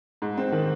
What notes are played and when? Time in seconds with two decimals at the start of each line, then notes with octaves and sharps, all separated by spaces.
0.22 G#2
0.37 C4
0.52 D#3